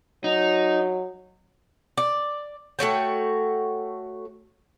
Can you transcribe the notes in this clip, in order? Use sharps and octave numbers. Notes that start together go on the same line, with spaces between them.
F#3 D#4
D5
A3 F#4 C#5 G5